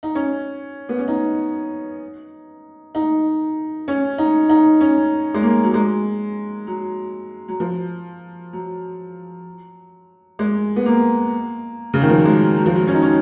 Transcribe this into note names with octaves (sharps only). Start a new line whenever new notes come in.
D#4
C#4
B3
C#4
D#4
D#4
C#4
D#4
D#4
C#4
G#3
A#3
F#3
G#3
F#3
F#3
F3
F#3
G#3
B3
A#3
C#3
D#3
F3
F#3
G#3
F#3
F3
F#3
C#4
D#4
C#4